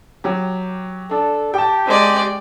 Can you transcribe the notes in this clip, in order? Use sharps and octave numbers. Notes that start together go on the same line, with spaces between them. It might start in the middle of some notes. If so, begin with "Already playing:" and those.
F#3 G4
D4 A4
G4 G5 A5
G#3 D5